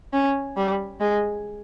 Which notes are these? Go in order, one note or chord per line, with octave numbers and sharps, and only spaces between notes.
C#4
G3
G#3